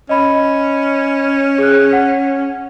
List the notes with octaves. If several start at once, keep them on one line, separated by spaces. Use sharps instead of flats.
C#4 D#5 B5
G#4 F#6
F#5